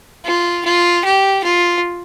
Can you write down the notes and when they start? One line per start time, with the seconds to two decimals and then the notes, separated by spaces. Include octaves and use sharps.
0.26 F4
0.65 F4
1.05 G4
1.44 F4